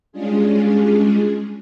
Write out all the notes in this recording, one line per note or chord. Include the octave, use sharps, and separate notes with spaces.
G3 G#3 C#4 D4 F4 G#4